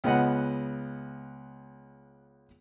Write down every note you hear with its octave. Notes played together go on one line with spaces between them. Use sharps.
C#2 B3 D#5 F#5